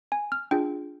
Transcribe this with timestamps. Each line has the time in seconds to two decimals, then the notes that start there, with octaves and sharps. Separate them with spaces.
0.12 G#5
0.32 F6
0.51 D4 F4 G#4 G5